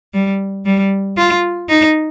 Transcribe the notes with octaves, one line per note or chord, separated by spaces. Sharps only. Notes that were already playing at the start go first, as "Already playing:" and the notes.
G3
G3
F4
D#4